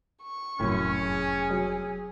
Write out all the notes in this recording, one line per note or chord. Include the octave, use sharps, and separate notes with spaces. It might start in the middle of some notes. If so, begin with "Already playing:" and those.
C#6
F1 F#2 A2 C#4 E4
G#4
F#3